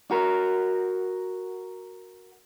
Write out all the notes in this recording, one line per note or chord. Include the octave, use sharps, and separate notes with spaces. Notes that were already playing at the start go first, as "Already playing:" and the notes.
F#4 A#4